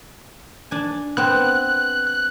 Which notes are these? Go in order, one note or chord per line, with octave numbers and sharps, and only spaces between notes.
D4 G#5
B3 C4 F#6
F#6